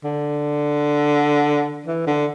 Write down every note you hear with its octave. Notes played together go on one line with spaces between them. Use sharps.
D3
E3
D3